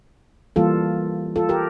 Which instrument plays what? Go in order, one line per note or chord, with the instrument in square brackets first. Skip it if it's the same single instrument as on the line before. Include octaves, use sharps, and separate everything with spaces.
[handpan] E3 G3 A#3 F4 A4
F4 A4
G4 A#4